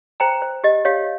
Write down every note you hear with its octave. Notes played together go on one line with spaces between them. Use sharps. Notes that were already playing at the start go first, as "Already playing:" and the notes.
C5 G5 A#5
C5
G4 D#5
G4 C#5 F5